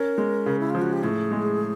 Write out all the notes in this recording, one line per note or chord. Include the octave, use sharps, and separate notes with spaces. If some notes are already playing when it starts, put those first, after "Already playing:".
Already playing: C#4 A#4
G#3
C#3
E4
F3 F4
F#4
G4
A2 G#4
G#3